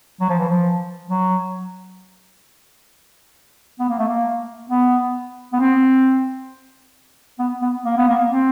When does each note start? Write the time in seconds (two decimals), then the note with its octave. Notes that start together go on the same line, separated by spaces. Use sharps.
0.20 F#3
0.29 F3
0.39 E3
0.49 F3
1.10 F#3
3.79 B3
3.89 A#3
3.99 A3
4.08 A#3
4.70 B3
5.53 B3
5.60 C4
7.39 B3
7.62 B3
7.84 A#3
7.97 B3
8.09 A#3
8.30 C4